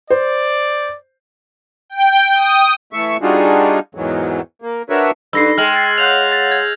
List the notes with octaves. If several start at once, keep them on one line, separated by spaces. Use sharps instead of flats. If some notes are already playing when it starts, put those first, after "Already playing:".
C5 D5
G5
D#6
E3 A3 E5 C#6
G3 D4 D#4 F4 F#4 G#4
E2 G#2 D#3 E3 F#3
A#3
D4 F#4 A#4 B4 C#5 E5
G2 D#4 A4 B5 E6 A#6 C7
G#3 G5 F6 F#7
A6
C#5 F5 F#5 F#6 G6 F7
A6
G#6